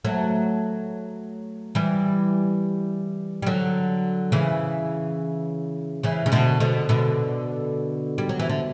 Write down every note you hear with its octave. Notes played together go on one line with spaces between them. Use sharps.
F#3 A3
E3 G3
G3
D3 F#3
C#3 E3
C#3 E3
C#3
B2 D3
B2 D3
B2 D3
G3
F#3
E3
D3